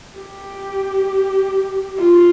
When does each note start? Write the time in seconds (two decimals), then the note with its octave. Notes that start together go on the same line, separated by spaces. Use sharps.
0.18 G4
1.99 F4